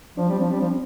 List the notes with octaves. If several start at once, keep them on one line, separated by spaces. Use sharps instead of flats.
F3 D4
G3 C4
F3 D4
G3 C4
F3 D4
C4